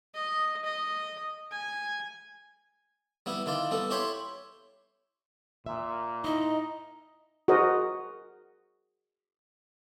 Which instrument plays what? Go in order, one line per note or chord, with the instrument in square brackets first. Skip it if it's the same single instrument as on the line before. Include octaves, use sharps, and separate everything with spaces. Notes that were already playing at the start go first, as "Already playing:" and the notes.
[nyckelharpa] D#5
D#5
G#5
[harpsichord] G3 B3 E4
D#3 E4 F4 D5
G3 B3 A4
E4 G4 C#5 G5 B5 C6
[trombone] A#2 [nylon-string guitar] E5
[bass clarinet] D#4 [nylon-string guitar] E4 [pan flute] D#5
[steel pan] F#4 G#4 A#4 C5 D#5